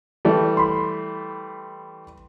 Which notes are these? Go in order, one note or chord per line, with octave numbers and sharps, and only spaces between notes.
E3 G3 A3
B5 C6